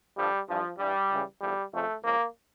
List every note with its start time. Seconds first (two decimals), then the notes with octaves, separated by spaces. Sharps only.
0.16 G2 D3 F3 G3
0.48 G2 E3 F3
0.78 G2 E3 G3
1.09 C#2 C#3 E3
1.41 E2 D3 F3 G3
1.72 F2 C#3 F3 A3
2.02 C#2 C#3 F3 A#3